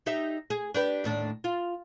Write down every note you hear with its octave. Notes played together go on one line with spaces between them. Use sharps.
D#4 G4 E5
G#4
D4 G4 B4
D#2 A2 D4
F4